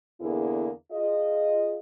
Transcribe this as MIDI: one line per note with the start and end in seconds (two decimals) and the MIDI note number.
0.20 0.70 40
0.20 0.70 50
0.20 0.70 58
0.20 0.70 59
0.20 0.70 64
0.20 0.70 68
0.91 1.78 65
0.91 1.78 68
0.91 1.78 75